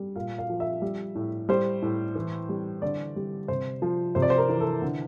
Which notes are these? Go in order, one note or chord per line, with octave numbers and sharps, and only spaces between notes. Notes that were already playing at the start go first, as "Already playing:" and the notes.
Already playing: G3
A#2 F5
F5
F3
E5
G3
A2
G3 C5
A2
E3
G3
D3 D5
G3
C3 C5
F3
C3 C5
D5
C5
A#4
E3
A4
D3